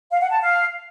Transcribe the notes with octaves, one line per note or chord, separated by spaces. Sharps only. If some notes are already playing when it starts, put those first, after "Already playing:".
F5
F#5
A5
F5